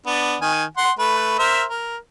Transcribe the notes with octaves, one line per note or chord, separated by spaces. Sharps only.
B3 D4
D#3 G#5
F#5 C6
A3 B4
A#4 C5 E5
A#4